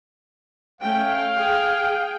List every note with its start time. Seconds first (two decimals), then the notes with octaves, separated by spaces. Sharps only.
0.81 A3 C#4 F5 G5
1.35 G#4 G5